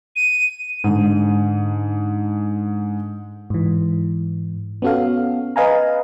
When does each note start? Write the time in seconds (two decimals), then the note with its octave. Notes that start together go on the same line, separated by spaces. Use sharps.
0.16 D#7
0.84 G#2 D3
3.50 G#2 E3
4.82 B3 C#4 F#4 A4 F5
5.56 B4 D#5 F5 G#5 A#5